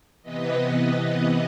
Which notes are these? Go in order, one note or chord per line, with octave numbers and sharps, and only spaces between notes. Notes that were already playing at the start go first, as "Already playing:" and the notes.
C3 E3 B3 B4 D#5